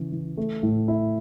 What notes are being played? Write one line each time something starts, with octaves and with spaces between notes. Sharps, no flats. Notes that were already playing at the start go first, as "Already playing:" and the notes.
Already playing: C#3 E3 C#4
E3
A3
A2
E4